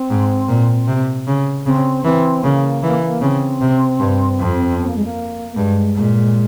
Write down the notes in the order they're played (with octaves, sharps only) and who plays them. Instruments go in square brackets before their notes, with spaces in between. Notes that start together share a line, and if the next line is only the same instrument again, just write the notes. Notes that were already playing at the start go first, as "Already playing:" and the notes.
Already playing: [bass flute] C4
[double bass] G#2
A#2
C3
C#3
[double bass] C#3 [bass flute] C4
[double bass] E3 [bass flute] C4
[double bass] C#3 [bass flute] A#3
[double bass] E3
[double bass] C#3 [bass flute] C4
[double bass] C3
G2
F2
[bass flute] C4
A#3
G#3
A#3
[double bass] G2 [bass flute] G#3
[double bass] A#2